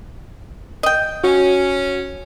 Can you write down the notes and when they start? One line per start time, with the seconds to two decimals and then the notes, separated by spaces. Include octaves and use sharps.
0.83 D#5 G5
1.24 C#4 F#4